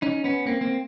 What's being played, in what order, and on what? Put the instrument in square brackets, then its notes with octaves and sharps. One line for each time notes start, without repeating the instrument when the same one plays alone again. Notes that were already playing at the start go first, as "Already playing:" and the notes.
[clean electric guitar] C#4 D#4
B3 C#4
A#3 C4
A#3 C4